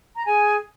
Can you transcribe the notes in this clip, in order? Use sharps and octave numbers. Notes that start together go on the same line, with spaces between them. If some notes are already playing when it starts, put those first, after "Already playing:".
A#5
G#4 G#5